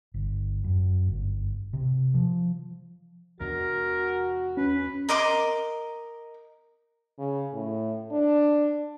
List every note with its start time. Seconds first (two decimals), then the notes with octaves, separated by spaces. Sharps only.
0.14 G1
0.64 F#2
1.07 G1
1.73 C3
2.14 F3
3.40 E2 B3 D4 F#4 A#4
4.57 C#4 B4
5.09 A#4 D#5 C6 D6
7.18 C#3
7.53 A2
8.11 D4